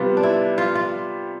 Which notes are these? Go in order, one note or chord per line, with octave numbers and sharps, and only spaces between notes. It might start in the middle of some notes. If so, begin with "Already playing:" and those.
Already playing: C3 G3 B3 F4
D4
E4
F4
F4